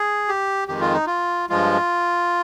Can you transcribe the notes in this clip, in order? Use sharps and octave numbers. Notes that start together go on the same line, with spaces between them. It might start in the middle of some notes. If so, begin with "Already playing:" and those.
Already playing: G#4
G4
F2 D#3 G#3 G4
F4
D#4
F4
G2 F3 G#3 F4